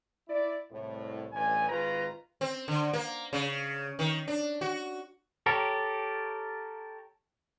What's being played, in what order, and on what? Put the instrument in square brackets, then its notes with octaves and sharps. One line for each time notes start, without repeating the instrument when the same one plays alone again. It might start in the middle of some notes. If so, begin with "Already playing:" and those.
[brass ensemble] E4 D5
C2 A2
A1 G2 G#5
G#1 D#3 F4 B4 A#5
[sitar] C4
D3
A#3
C#3
D#3
D4
F#4
[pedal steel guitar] G4 A4 A#4 C#5